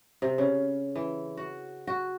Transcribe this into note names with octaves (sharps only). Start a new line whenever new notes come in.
C3
C#3
E3
F#4
F#4